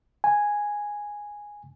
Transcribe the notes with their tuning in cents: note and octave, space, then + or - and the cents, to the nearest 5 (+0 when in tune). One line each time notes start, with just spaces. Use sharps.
G#5 -5